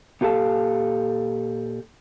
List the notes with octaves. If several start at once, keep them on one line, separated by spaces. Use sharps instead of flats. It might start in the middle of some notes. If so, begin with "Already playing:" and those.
A#2 G4 A4 F5 A5